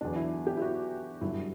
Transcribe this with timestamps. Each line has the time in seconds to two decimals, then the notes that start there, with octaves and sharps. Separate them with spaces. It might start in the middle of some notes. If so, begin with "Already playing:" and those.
0.01 E2 D3 F#3 D4
0.16 E4
0.47 G4
0.57 E4
0.62 F#4
1.21 G2 D3 F#3 E4